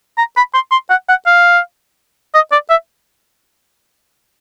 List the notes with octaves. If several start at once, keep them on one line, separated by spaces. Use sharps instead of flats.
A#5
B5
C6
C6
F#5
F#5
F5
D#5
D5
E5